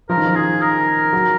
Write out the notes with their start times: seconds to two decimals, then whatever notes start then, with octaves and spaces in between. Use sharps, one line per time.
0.09 F3 A#4
0.17 D#3
0.26 F3
0.35 G#4
0.61 A#4
1.13 F#3